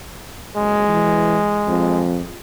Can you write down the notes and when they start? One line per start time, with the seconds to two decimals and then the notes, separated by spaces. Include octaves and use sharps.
0.57 F#1 G#3
0.88 E3
1.68 F2